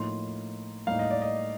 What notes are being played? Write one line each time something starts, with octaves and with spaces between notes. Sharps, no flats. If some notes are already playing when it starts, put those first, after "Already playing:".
Already playing: A2 F3 A#3 D#4 C6
A2 G3 A#3 D#4 F5
D#5
D5
D#5